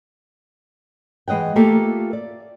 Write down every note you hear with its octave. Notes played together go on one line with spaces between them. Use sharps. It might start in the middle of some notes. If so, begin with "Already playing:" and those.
E3 G#3 D#5 F#5 G5
A3 A#3 F4 G4 A4 A#4
D5